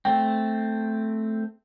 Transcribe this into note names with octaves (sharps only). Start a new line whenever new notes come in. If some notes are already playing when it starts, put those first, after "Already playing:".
A3 C4 G5